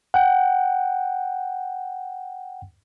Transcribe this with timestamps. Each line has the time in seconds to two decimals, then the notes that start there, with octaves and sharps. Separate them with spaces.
0.14 F#5 G5